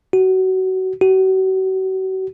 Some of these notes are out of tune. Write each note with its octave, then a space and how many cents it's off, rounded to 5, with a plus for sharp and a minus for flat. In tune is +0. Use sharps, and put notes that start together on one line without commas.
F#4 +25
F#4 +40